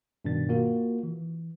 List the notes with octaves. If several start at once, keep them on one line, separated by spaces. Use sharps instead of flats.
G2 B2 D#3 D4 A6
A#3 F4 F#4 A#4
E3